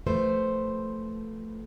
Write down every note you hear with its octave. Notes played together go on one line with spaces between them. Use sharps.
F3 A3 B4 C5